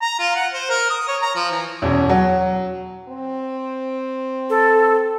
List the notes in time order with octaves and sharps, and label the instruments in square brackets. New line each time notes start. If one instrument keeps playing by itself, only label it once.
[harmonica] A#5
F4
F#5
C5
A#4
D#6
C#5
A#5
F3
E3
[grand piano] E2 B2 C#4
F#3
[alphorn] C4
[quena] A4